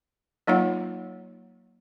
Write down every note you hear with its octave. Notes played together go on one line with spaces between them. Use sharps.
F#3 A#3 D#4 F4 C#5 F#5